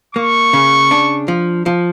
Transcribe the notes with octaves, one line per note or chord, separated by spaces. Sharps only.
A#3 C#6
C#3
D4
F3
F3